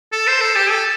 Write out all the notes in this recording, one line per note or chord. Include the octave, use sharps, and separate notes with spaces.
A4
C5
A4
G4
A4